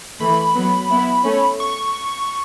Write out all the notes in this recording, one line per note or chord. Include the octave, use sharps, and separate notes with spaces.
E3 A3 B5
F#3 B3
B3 E4
A3 C#4
C#6